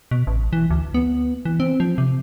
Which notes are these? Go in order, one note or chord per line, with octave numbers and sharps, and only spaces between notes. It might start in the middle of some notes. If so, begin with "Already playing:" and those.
B2
A1
E3
D2
B3
E3
C4
F3
C3